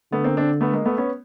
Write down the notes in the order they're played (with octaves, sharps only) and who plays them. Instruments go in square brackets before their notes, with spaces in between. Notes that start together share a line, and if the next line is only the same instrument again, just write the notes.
[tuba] D3 [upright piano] A3 B3
[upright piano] A#3 C4
C4 D4
A3 B3
G#3 A#3
A3 B3
B3 C#4